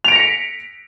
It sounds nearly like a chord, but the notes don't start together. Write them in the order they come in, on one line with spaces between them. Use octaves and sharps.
F7 D7 A#6 C#7 B6